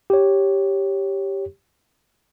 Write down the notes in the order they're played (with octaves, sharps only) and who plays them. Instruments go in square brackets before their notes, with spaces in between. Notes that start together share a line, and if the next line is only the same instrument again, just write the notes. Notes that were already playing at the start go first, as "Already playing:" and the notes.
[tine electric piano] G4 C#5